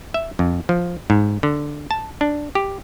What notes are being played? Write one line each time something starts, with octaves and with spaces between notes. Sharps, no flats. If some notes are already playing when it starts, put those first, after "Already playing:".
E5
F2
F3
G#2
D3
A5
D4
G4